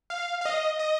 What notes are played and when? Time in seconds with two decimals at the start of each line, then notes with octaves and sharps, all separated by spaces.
0.10 F5
0.41 F5
0.45 D#5
0.79 D#5